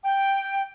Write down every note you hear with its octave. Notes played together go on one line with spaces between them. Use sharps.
G5